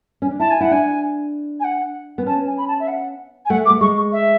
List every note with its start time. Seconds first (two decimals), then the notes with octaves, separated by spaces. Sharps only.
0.22 C#4
0.31 D4
0.40 E4 A5
0.51 G#5
0.60 E4 F#5
0.71 D4 G#5
1.60 G#5
1.64 F#5
2.18 B3
2.26 C#4 A5
2.46 G#5
2.57 B5
2.68 A5
2.80 E5
2.88 F#5
3.45 G#5
3.50 A3 F#5
3.66 D6
3.70 A3
3.81 G#3 C#6
3.97 C#6
4.12 E5